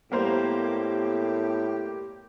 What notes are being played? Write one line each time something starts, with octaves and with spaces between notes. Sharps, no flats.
A2 G3 A#3 B3 G4 C5 A#5